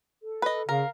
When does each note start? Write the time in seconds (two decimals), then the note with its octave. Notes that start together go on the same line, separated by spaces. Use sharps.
0.22 A4
0.42 B4 D#5
0.69 C#3 A#4 F5